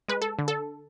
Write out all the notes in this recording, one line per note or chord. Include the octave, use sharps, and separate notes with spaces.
G#3 B4
A4
D3
A4